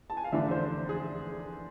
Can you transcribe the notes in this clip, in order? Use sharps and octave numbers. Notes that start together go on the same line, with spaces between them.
A5
G#5
F5
F1 E2 D3 A3 D4 E5
C5
G#4